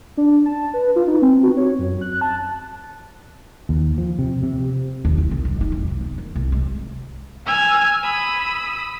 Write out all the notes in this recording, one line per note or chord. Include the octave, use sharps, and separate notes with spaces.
D4
A5
B4
F4
D#4
C4
F#4
C#5
F#2
F#6
A5
D#2
F3
C3
C3
D#2
E4
C2
G2
D#4
F2
C2
B3
D#3
C2
G#3
G#5 E6 F6 G#6
B5 D#6 E6